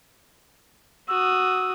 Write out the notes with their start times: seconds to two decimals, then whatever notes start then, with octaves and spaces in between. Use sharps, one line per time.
1.08 F#4 D#6 E6